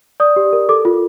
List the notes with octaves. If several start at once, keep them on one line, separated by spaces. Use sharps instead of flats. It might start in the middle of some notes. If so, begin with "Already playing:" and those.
D5 D#6
G4
A#4
A4 D6
F4